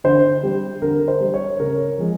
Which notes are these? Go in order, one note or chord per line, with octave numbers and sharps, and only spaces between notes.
D3 C5
G3
D3 A#4
C5
G3
C#5
C#3 A#4
F3 G#3